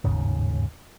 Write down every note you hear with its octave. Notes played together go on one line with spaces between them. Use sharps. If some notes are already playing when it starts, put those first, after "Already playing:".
G1 D#2 G#2 C#3